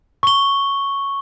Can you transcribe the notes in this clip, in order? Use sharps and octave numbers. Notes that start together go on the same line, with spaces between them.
C#6 G7